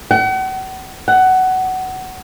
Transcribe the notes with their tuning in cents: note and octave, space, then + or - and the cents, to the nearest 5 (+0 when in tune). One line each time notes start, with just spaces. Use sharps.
F#5 +40
F#5 +15